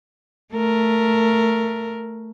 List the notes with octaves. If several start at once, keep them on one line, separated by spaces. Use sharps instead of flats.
A3 A#4